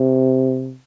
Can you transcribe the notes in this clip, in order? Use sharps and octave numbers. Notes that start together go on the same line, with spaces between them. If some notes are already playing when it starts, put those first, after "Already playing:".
Already playing: C3